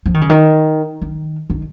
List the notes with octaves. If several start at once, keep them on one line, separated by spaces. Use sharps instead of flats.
F3
D#3
C#3
D#3
D#3
D#3